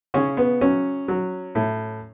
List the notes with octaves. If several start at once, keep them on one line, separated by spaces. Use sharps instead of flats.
C#3 C#4
B3
F#3 C#4
F#3
A2